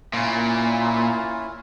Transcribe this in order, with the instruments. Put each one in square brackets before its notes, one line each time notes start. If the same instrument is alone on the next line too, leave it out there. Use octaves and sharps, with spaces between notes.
[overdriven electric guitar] A#2 [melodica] C#4 E4 F4